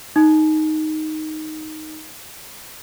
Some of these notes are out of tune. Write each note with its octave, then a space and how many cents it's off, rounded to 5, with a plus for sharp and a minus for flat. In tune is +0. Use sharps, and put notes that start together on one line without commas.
D#4 +0